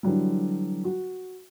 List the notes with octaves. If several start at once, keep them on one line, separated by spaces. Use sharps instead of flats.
D3 E3 F#3 G3
F#4